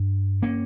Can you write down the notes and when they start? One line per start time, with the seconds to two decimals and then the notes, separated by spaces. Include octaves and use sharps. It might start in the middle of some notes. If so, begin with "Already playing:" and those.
Already playing: G2
0.42 A#3 C#4